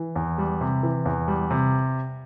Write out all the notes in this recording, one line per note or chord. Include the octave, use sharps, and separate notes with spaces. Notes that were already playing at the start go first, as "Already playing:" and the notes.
Already playing: E3
E2
G3
C3
E3
E2
G3
C3